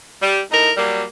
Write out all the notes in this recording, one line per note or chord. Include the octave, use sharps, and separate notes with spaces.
G3
A2 D#4 A#4
F#3 G3 A#3